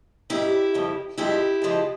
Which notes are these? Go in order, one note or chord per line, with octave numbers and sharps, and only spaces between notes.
G#2 G3 E4 G4
F2 C#3 G3
G2 F3 G#3 E4 G4
F2 C#3 F3 G#3